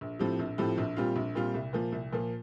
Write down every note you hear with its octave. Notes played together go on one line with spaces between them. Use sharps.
A#1
A2 F3 C4 G4
A#1
A2 F3 C4 G4
A#1
A#2 G3 C4 F4
A#1
A#2 G3 C4 F4
C2
A#2 F3 A#3
C2
A#2 F3 A#3